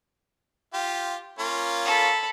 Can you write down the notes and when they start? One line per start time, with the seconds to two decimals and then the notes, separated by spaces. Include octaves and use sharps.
0.74 F4 G4
1.39 A#3 C#4 F4
1.85 A4 B5